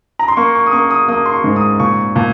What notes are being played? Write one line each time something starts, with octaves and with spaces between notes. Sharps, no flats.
A#5
C6
A#3 C#6
C#6
D#6
A#3 C#6
D#6
A#3 D#6
C6
C#6
G#2
D#6
A#2 C#6
A#2